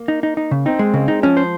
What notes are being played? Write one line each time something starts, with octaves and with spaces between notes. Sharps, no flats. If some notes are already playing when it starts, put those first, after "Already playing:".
Already playing: A#3
D#4
D#4
D#4
C#3
C4 D#4
G#3
C#3 G#3
D#4
F3 C#4
C5